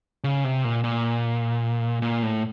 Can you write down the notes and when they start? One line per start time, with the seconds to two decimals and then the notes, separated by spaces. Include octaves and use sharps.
0.24 C#3
0.44 C3
0.64 A#2
0.84 A#2
2.02 A#2
2.23 A2